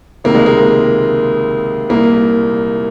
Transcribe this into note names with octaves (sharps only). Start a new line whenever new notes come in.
C#2 C3 D#3 A#3
G#3
A#3
C2 A#2 A#3